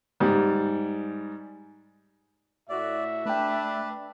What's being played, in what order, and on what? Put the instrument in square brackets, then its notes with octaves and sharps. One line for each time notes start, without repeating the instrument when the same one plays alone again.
[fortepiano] G#2 G3
[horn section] A2 F#4 [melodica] D5 [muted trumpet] E5
[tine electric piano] A3 G5 [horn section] D4 [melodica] B4